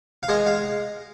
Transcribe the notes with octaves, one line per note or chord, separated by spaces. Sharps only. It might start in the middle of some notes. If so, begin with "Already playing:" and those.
F5
G#3 D#5
F5